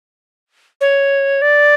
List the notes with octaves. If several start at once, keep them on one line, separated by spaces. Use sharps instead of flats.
C#5
D5